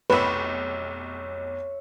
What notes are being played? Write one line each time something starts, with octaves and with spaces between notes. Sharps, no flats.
F1 B1 B4 C#5 E5